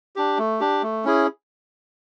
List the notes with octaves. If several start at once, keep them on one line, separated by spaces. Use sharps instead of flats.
D4 G4
A3
D4 G4
A3
C#4 E4 G#4